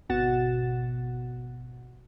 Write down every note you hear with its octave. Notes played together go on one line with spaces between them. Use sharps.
G#1 B2 F#4 F#5 A6 E7